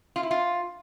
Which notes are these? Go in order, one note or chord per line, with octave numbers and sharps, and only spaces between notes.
F4
E4
F4